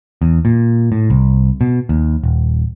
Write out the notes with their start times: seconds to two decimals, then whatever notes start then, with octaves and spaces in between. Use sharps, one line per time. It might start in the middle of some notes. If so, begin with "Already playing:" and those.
0.22 E2
0.45 A#2
0.92 A2
1.10 C2
1.61 B2
1.89 D#2
2.23 D#1